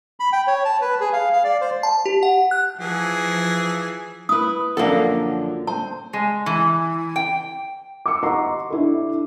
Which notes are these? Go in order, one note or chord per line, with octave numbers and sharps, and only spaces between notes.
B5
G5
C#5
A5
B4
G#4
F5
F5
D5
C5
A5
G4
F#5
F#6
E3 F3 G#4
E4 B4 D#6
F#2 D3 F3 A#3 A4 F#5
C5 A5
G#3
E3
G5
D6 E6 C#7
D#5 F#5 A#5 C6 C#6 C7
D4 E4 A4